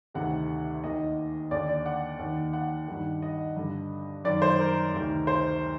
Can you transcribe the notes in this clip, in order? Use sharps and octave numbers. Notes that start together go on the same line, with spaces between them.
D2 C3 D#3 F#5
D#2 D#3 D#5
D#2 D3 D5
D5
F#5
D#2 D#3
F#5
G2 D#3
D#5
G2 D3
F#2 D#3 D5
C5
A#4
D2 C3 D#3
C5